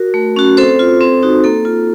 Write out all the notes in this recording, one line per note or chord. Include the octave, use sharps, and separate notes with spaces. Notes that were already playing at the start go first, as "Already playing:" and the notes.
Already playing: F#4 A#4
A3
C#4 F#4
C4 A4 C5
F4
C4
D#4 F#4
A#3 A4
F4